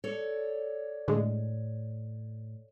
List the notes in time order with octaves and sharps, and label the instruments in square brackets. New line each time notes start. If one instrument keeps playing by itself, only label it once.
[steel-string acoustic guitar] A4 C#5 D5
[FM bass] A2 [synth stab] D3 G#3